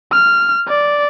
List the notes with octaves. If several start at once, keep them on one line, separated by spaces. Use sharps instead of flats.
F6
D5